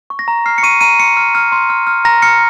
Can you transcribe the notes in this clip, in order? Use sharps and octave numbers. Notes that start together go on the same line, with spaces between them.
C#6
A#6
A#5
F6 C7
C#7
C#6 D#7
A#5 D#7
C6 C#7
F6
F6
C6
F6
F6
A#5 A#6
F6 C#7